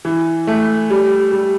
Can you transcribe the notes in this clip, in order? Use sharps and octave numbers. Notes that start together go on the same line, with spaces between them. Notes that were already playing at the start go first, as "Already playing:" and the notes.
E3
A3
G3
G3